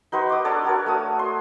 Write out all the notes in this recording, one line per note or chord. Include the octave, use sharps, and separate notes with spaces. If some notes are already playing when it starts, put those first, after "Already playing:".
D#4 F#4 B4 C5
D6 D#6
D4 A4 C#5 D5
F#4 A#4 C#5
A3 A5 D#6
C6